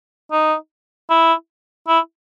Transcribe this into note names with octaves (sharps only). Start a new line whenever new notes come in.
D#4
E4
E4